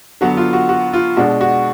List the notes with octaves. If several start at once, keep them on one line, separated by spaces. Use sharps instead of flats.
D3 F#3 B3 F#4
F4
F#4
F#4
F4
B2 G#3 D4 F#4
F#4